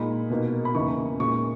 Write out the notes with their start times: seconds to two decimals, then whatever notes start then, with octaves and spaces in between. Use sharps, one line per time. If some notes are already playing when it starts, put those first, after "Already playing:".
Already playing: A#2 G#3 D#4 B5
0.30 B2 A#3 D#4
0.65 B5
0.75 E2 C#3 E3 A#3 D#4 C#6
1.20 A#2 G#3 C#4 C#6